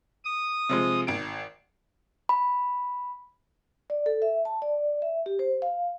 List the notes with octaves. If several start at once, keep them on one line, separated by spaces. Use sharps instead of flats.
D#6
C3 F3 G#3
G#1 D7
B5
D5
A4
E5
A5
D5
E5
G4
C5
F5